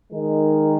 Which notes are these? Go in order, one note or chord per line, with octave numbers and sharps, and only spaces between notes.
D#3 G#3 D#4 A#4